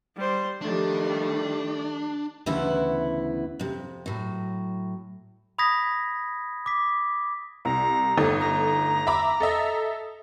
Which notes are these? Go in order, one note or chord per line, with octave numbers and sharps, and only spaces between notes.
G3 C5
D#3 F3 G3 A3 D4
D2 C#3 E3 B3 E4 F#5
F2 C3
A2 F#3
B5 D#6 G#6 A#6 B6
D6 B6
C2 A#5
G1 A3 D#4
A#5
E5 B5 D6
A4 D#5 E5